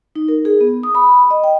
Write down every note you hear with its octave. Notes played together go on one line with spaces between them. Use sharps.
D#4
A#4
G#4
B3
D#6
B5
D#5
G5